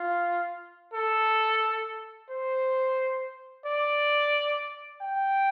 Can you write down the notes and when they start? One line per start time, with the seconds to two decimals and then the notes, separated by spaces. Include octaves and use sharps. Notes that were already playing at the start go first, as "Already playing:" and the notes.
Already playing: F4
0.94 A4
2.30 C5
3.66 D5
5.02 G5